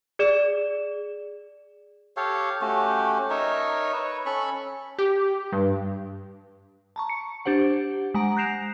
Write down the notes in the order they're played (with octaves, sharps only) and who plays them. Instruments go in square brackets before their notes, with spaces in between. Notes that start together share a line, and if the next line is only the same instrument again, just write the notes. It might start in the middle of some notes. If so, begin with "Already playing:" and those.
[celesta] G#4 D5 E7
[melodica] G4 A4 C#5 F5
A3 C#4 F#4 G4
D#4 A#4 C#5 E5
B4 C#5
C#4 A4 B5 C#6
[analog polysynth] G4
G2
[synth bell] A5 A#5 C#6
C#7
D4 G4 C5 F#5
G#3 F#5 A#5 D7
F#6 G6 A#6 C7 E7 F7